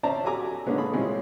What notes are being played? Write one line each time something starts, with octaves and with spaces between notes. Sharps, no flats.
C#4 C5 D5 E5 A5 A#5
F#4 G4 A4 G#5 A#5 D6
D3 G#3 A#3 B3 C#4 D4
G#4 A4 B5
A#2 G3 G#3 C4 C#4 E4